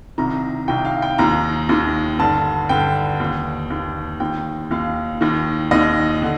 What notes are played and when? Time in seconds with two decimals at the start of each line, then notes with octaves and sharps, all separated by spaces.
0.18 C2 C3 D#3 A#5
0.68 C2 C3 D#3 G5
0.85 F5
1.02 G5
1.18 D#2 D#3 A#5
1.69 D#2 D#3
2.19 G2 D3 A5
2.69 G2 D3 G5
3.20 D#2 D#3
3.70 D#2 D#3
4.20 D#2 D#3 G5
4.71 D#2 D#3 F5
5.21 D#2 D#3
5.71 D#2 D#3 D#5
6.22 D3